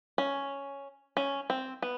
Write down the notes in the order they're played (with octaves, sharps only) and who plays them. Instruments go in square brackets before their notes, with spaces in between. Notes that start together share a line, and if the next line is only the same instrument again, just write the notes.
[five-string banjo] C#4
C#4
C4
B3